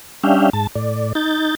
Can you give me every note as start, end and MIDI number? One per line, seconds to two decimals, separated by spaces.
0.23 0.50 55
0.23 0.50 61
0.23 0.50 62
0.23 0.50 76
0.23 0.50 77
0.23 0.50 79
0.53 0.67 44
0.53 0.67 81
0.75 1.13 45
0.75 1.13 74
1.15 1.55 63
1.15 1.55 91
1.15 1.55 93